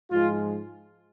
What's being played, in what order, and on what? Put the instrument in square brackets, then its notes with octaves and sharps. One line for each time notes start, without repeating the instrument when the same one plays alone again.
[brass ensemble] G#2 F3 G#3 F4